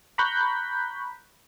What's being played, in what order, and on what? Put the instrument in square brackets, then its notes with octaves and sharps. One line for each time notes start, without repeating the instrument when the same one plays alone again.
[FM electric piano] A#5 B5 C#6 F#6 G6 B6